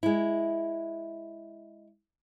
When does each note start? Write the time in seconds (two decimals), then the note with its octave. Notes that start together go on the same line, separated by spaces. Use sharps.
0.03 G#3 E4